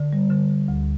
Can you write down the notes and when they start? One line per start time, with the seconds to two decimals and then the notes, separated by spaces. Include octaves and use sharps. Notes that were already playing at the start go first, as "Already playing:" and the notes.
Already playing: D3
0.13 G3
0.30 D3
0.50 D3
0.68 D2